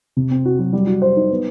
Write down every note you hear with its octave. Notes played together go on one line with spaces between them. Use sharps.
C3
C4
F#4
F#3
G3
F#4
C5
D#4
B3